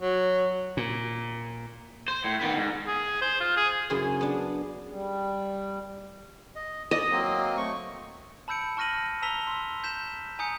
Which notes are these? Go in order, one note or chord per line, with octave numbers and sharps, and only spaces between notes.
F#3
A#2
C5
A2
D#3 B3
G#2
G#4
C5
F4
G#4
F#2 C#3 E4 G#4 C5
B3 D4
G3
D#5
G#2 D5 D#5
F#3 A#3 C4
A3 C#6
A5 B5 E6 G6 C#7 D7
A5 C#6 F6 A#6 D#7 F#7
A5 A#5 E6 B6 F7 G7
C6 E6
G6 B6 E7
G#5 A#5 D#6 G6 C#7